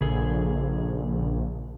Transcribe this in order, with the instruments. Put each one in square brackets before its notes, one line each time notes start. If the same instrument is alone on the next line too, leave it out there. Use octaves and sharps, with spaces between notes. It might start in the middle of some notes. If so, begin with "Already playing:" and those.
[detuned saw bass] A#1 [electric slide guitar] C#3 G#4 A4